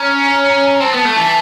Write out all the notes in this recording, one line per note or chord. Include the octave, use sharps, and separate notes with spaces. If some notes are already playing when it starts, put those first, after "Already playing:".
Already playing: C#4 A#5
C4 A5
B3
A3
E3